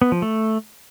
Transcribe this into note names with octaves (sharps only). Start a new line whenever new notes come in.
B3
F3
A3